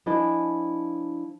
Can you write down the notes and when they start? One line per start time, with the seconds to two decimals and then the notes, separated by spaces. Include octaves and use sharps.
0.06 F3 D4 E4 D#5 G#5